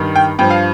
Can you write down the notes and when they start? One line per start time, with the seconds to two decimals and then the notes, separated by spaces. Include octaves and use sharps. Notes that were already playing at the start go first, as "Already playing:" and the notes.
Already playing: G2 D#3
0.16 G5
0.39 G2 F3 G5
0.50 F5